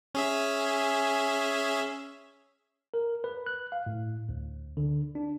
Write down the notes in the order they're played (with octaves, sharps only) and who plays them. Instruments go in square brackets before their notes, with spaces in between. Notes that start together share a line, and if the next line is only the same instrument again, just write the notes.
[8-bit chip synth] C#4 G#4 E5
[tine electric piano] A#4
B4
F#6
F5
A2
D2
D3
D4